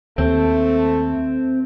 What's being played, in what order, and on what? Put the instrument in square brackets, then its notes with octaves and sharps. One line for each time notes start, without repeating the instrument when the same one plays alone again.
[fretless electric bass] D#2 [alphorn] A3 [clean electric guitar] C4